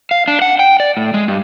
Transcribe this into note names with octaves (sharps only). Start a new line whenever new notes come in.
F5
D4
F#5
G5
D5
A2
G#3
G2